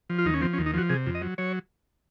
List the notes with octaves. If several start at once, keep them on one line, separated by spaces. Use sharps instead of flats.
F3
F4
D#2 D#4
C#4
F3 C4
C#4
D#2
D#4
F3 F#4
C3 G#4
F2
D#5
F#3
F#3 C#5